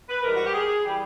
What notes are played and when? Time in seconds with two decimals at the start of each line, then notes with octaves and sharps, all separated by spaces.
0.09 B4
0.23 G#2 E3 G3 A#4
0.36 F#4
0.45 G4
0.53 G#4
0.83 E3 G3 G4